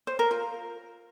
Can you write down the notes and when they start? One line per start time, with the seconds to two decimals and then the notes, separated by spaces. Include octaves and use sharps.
0.07 C5
0.19 A#4
0.31 F4